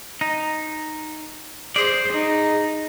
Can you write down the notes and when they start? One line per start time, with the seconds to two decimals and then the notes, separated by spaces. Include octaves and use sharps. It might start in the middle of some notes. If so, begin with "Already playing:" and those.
0.21 D#4
1.76 G#4 C5 D5
2.13 D#4